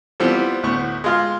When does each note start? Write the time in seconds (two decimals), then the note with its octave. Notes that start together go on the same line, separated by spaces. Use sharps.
0.20 E3 F3 G3 B3 C4
0.63 D2 A2 B3 C#6
1.04 G#3 F4 F6